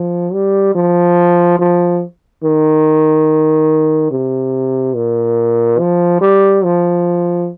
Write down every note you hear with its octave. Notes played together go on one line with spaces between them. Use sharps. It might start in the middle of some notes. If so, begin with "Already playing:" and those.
Already playing: F3
G3
F3
F3
D#3
C3
A#2
F3
G3
F3